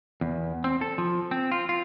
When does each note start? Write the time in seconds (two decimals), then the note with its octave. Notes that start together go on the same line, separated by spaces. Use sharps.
0.21 E2
0.64 C4
0.81 A4
0.98 F3
1.31 C4
1.52 F4
1.69 F4